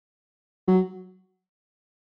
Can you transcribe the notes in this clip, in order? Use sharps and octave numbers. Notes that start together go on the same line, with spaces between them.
F#3